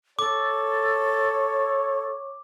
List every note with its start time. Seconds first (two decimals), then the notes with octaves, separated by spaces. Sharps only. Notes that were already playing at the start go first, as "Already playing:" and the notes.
0.19 A4 C#5 D6